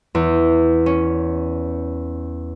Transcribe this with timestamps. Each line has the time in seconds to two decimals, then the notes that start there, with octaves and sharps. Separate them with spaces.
0.15 E2
0.86 C#4